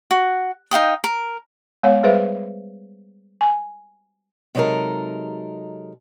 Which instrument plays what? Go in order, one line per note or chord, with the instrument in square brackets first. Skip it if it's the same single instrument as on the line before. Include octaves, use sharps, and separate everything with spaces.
[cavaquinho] F#4
D#4 F5 G5 D#6
A#4
[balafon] G#3 B3 C#5 F5 F#5
G3 G#4 B4 C5 E5 F5
G#5
[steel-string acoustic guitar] C3 F#3 G#3 D#4 A4 A#4